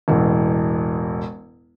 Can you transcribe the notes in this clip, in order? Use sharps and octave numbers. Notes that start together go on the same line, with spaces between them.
E1 A1